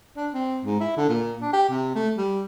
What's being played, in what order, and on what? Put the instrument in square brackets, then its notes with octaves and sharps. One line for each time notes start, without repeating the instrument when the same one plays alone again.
[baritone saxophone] D4
C4
G#2
E4
D3
A#2
D4
G4
C3
A3
G3